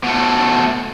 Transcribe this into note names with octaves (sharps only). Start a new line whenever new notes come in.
B2 A3